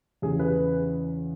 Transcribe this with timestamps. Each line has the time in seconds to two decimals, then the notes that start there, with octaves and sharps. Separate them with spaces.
0.22 E2 C#3 E3 G#4
0.39 G#4 B4